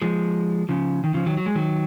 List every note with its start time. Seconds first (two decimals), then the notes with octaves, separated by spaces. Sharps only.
0.02 F3 G#3
0.69 C#3 F3
1.04 D#3
1.14 C#3 F3
1.26 D#3 F#3
1.37 F#3
1.46 G#3
1.55 D#3 F#3